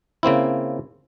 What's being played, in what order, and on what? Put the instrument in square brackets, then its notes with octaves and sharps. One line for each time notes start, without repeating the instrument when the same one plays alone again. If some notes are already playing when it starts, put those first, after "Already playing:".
[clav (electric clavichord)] C#3 A#3 C4 E4